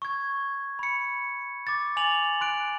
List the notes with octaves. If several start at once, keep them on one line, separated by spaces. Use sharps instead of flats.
C#6 G#6
B5 C#7
D6 A6
G#5 D6 A6 F7 F#7
C6 F#6 D7